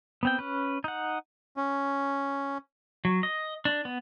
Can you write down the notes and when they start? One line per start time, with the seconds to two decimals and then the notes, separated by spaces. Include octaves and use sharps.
0.23 B3 C4 G5
0.39 C#4 B4
0.84 D#4 F#5
1.57 C#4
3.05 F#3
3.23 D#5
3.65 D4
3.85 B3